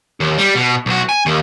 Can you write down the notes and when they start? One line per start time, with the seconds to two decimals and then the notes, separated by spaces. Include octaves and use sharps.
0.20 D#2
0.38 G3
0.55 B2
0.86 B1 F#4
1.09 G#5
1.26 D#2